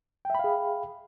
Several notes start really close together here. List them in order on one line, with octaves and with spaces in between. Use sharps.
G5 E5 B5 F5 G#4